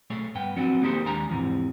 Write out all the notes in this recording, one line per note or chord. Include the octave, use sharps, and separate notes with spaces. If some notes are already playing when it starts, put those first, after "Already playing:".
B1 A3 G#4 C#5
G2 B3 G5
F3 F#3 B3 C4 D4 F#4
A#3 D#4 G4 A4 C5
D#2 G#3 D4 G#5 A#5
E2 G#2 C3 E3 F3